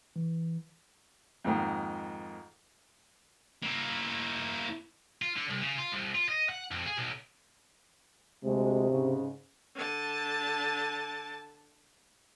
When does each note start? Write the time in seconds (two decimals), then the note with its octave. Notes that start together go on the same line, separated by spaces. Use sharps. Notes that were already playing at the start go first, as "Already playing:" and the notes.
0.16 E3
1.44 F2 G#2 D#3 A#3
3.62 A#3 E4
5.22 F4
5.37 D3
5.50 C2
5.62 C#3
5.78 F4
5.92 C2
6.15 F4
6.29 D#5
6.49 F#5
6.71 F2
6.86 G#4
6.98 B1
8.44 D2 C3 G#3
8.90 G#2 C#3
9.75 D3 A5